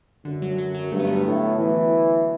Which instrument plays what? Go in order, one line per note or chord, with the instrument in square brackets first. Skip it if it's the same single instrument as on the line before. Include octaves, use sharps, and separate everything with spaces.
[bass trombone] F#2 [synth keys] D3
[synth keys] F#3
F#3
F#3
[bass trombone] G2 [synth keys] A3
[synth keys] B3
A3
[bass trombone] A2
E3